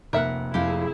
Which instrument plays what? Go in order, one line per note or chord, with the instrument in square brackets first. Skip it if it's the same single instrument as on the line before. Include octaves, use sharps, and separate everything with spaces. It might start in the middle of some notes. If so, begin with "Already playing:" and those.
[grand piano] F1 A#3 F#6 [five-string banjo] A#4 E5 F#5
[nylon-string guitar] F2 A3 F5 [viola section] E4 G#4 [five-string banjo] G4